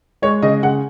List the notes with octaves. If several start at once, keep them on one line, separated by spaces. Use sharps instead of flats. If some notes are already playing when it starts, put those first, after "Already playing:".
G#3 C#5
C#3 D#5
C#3 F#5